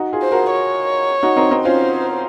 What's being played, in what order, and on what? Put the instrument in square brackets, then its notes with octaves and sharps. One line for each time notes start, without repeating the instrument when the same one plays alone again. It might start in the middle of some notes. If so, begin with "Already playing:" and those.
Already playing: [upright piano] D#4 F#4
F4 G#4
[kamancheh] C5
[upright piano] F#4 A#4
[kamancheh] C#5
[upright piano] D#4 F#4
C4 D#4
C4 D#4
[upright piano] C#4 F4 [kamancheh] C5